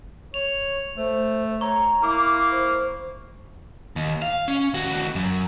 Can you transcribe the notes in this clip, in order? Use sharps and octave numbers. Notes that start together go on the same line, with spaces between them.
C#5 F7
A3 C5
C#5 A#5 C#6
A#3 E4 D6
C5
D#2
F5
C#4
D#2 F#4
F#2